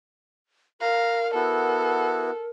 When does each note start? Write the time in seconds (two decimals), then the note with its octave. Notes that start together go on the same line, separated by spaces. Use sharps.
0.81 A#4 F5 A#5
1.35 B3 E4 F#4 A4